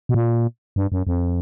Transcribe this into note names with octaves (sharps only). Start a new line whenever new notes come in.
B2
A#2
G2
F#2
F2